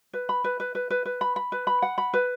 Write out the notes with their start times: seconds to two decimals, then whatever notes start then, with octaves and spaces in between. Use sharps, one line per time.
0.13 B4
0.29 B5
0.44 B4
0.60 B4
0.75 B4
0.90 B4
1.05 B4
1.21 B5
1.36 B5
1.52 B4
1.67 B5
1.82 F#5
1.98 B5
2.14 B4